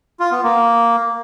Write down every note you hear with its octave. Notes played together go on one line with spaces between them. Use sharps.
F4
B3
A#3